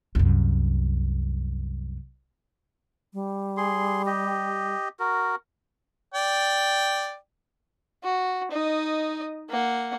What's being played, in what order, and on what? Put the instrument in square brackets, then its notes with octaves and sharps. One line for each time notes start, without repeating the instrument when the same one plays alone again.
[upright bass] C2 F#2
[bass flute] G3
[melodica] G#4 C6
G4 D#5
F#4 A#4
[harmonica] D5 G5
[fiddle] F#4
D#4 D#5
A#3 F#5